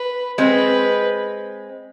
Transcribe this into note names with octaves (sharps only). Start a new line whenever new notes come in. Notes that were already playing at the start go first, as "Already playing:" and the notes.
Already playing: B4
G#3 C4 B4